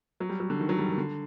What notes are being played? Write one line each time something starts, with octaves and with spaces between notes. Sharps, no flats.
F#3
G3
F#3
D3
D#3
F#3
G3
D#3
D3